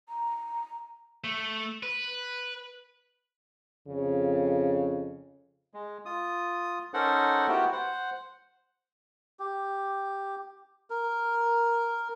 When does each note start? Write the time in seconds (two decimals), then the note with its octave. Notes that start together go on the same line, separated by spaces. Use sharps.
0.09 A#5
1.24 A3
1.83 B4
3.88 F2 C#3
5.74 G#3
6.06 F4 D#6
6.94 C#4 D#4 A4 A#4 C5 F#5
7.48 B3 E4 F#4 G4 G5
7.72 C5 F#5
9.39 G4
10.90 A#4